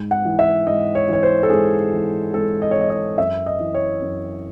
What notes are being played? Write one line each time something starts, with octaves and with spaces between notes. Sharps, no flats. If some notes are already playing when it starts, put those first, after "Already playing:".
Already playing: G#2
F#5
E3
E5
G#2 D#5
C#5
E3 C#5
C5
A4
G#2 G#4
E3
G#2 A4
D#5
C#5
E3 D#5
D#5
F#2 E5
D#5
E3
C#5
F#2